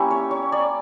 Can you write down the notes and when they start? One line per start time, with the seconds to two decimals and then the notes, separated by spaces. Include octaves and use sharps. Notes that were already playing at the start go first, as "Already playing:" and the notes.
Already playing: A#3 C#4 E4 G4
0.11 C#5
0.31 C#5
0.52 D5